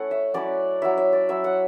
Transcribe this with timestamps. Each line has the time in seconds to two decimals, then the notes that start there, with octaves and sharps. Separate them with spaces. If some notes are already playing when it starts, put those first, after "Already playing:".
Already playing: A3 C#4 E4 F#5
0.11 E5
0.34 F#3 C#4 E4 D5
0.82 F#3 C#4 E4 E5
0.97 E5
1.13 D5
1.29 F#3 C#4 E4 E5
1.44 F#5